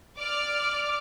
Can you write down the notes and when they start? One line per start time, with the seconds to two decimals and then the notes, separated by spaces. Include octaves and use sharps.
0.18 D5 D6 F6